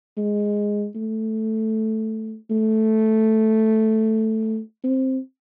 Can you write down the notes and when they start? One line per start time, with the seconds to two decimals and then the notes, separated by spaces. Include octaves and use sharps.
0.17 G#3
0.96 A3
2.50 A3
4.84 C4